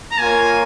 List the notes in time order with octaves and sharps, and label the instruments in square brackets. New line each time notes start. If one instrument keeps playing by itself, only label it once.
[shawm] A#5
[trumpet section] A#3 F4 A#4 C#5 [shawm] G#5